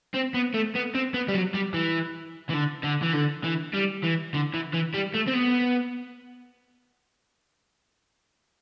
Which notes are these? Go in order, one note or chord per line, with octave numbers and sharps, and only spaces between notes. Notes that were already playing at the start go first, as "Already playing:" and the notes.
C4
B3
A3
B3
C4
B3
G3
F#3
G3
E3
E3
D3
D3
E3
D3
E3
G3
E3
D3
E3
E3
G3
A3
C4
B3